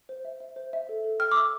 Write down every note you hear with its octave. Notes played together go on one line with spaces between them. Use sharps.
C5
E5
E5
C5
E5
A4
A4
G5 F6
D6
E5 E6